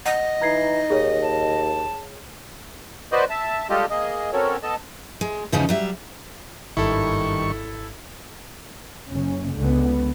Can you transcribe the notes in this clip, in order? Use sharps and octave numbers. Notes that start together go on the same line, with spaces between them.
D#5 F#5
E3 D#4 A#5 G#6 C7
D#2 G#4 C#5
A5
F#4 B4 C5 D5 D#5
E5 A5
G3 G#3 F4 G4 A4 D#5
A#3 G#4 D#5
C4 C#4 F#4 A4 A#4 C#5
B3 A4 D#5 A5
G#3
E2 C#3 F3 C#4 D#4
F#3 G3 E5
G#1 G2 D#3 E4 A4 C#6
F#1 C#4
C#2 D3 B3